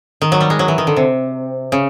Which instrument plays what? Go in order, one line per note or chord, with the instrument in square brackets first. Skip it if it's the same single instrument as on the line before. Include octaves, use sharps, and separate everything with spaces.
[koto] D#3
F#3
G3
G#3
F#3
E3
D#3
D3
C3
C#3